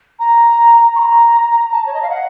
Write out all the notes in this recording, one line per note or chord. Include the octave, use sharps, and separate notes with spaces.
A#5
C#6
A#5
A5
C#5
D#5
F5
F#5